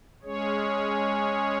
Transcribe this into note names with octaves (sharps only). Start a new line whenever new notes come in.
G#3 C#4 G#4 C#5